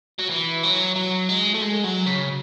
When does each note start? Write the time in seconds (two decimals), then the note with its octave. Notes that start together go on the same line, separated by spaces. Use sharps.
0.19 F#3
0.29 E3
0.63 F#3
0.96 F#3
1.29 G#3
1.54 A3
1.62 G#3
1.84 F#3
2.06 C#3